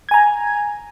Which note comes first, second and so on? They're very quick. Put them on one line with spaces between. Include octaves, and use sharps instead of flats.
G#6 G#5 A#5